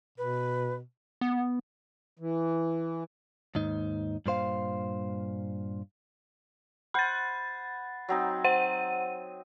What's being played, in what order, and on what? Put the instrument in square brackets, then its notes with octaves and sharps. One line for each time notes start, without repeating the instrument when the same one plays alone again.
[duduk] B2 [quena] B4
[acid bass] B3
[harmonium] E3
[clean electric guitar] D#2 G#2 D#4
G2 A#2 C5 F5
[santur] C5 F#5 [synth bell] B5 A6
[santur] F#3 C4 D#4
[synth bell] C5 F#5 D#7